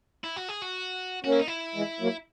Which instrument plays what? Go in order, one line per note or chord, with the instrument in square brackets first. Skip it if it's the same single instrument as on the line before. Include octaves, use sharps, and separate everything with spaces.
[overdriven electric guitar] E4
F#4
G#4
F#4
[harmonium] A#3 C#4 [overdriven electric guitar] F#4
[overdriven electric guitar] E4
D#4
E4
[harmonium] E3 G#3
F#3 A#3